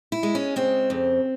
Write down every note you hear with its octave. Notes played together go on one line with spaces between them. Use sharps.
E4
G#3
C#4
C#3 C4
F2